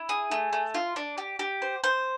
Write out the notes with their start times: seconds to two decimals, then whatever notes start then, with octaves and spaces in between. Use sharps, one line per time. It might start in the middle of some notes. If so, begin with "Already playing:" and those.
Already playing: E4
0.09 G#4
0.31 A3
0.53 A3
0.74 F4
0.96 D4
1.18 G4
1.39 G4
1.62 C5
1.84 C5